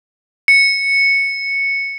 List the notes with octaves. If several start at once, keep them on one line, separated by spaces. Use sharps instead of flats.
C#7